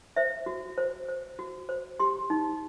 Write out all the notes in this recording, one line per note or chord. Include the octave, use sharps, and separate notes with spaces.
C5 E5
F#4
C5
C5
F#4
C5
G4 C6
D#4